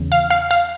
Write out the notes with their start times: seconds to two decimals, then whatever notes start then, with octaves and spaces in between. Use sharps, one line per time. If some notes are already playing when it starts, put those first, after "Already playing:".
Already playing: E2 C#3
0.12 F5
0.30 F5
0.51 F5